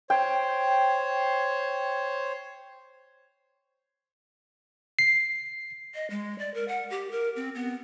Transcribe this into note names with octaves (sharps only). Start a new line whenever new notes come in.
C5 C#5 G5
C7
D#5
G#3
D5
A#4
F#5
G4
A#4
C4
B3